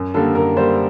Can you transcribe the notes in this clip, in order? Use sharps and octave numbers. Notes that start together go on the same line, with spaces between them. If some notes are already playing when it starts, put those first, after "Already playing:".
Already playing: F#2
D3 G3 A#3 A4
F#2 A#4
D3 G3 A#3 C5